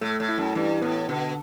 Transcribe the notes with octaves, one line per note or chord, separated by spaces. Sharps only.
A2 A3
A2
E4
F#2
G2 E3
A2 B3
B2 D3